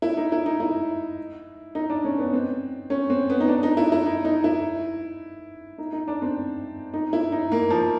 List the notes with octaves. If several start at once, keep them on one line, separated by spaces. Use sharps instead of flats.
E4
D#4
E4
D#4
E4
D#4
D4
C#4
B3
C4
C#4
C4
B3
D#4
D4
D#4
E4
E4
D#4
D#4
E4
D#4
D#4
D4
C4
D#4
E4
D#4
A#3
F3